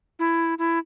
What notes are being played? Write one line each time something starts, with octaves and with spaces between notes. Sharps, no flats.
E4
E4